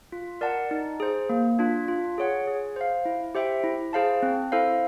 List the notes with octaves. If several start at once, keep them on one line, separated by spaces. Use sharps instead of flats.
F4
A#4 D5 F#5 A5
D#4
G#4 C5
A#3
D4 F4
F4
G#4 C#5 F#5
G#4
C5 F5
E4
G4 C5 E5 G5
E4
G#4 C5 F5 A5
C4
E4 A4 C5 F5